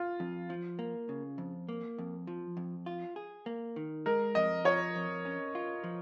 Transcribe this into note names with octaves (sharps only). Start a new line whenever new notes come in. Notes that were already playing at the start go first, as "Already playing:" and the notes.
Already playing: F4
F2
F3
A#3
C#3
F2
A#3
F2
F3
F2
F4
G#4
A#3
D#3
G#3 A#4
F2 D#5
F3 C#5
F2
C#4
F4
F3